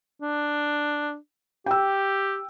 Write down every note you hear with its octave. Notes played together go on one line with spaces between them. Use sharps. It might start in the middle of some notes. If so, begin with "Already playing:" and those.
D4
G4 G5 E6